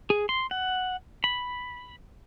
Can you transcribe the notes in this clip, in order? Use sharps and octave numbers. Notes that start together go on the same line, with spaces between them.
G#4
C6
F#5
B5